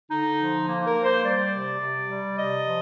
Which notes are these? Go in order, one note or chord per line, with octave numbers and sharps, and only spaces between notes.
D3 D#4
F3
A#3
A#4
A#3
C5
G3 D5
C3
C3
G3
C3 D#5
F3